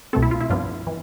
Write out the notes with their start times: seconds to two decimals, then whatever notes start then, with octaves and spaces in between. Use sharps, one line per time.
0.13 C2 B2 A3 C4 A4
0.22 E4
0.31 F4
0.41 E4
0.50 G2 F3 B3 D4 F4
0.87 E3